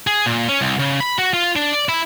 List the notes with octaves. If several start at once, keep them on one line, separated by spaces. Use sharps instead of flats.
G#4
A#2
C#4
C2
C#3
B5
F#4
F4
D4
D5
E4